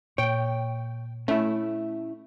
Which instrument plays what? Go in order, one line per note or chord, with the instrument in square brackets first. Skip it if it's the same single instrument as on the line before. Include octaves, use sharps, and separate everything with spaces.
[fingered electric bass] A#2 [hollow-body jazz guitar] C#5 [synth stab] G5
[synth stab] A3 [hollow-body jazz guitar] C#4 E4